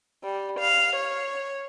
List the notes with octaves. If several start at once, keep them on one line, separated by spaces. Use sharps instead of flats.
G3
F5
C#5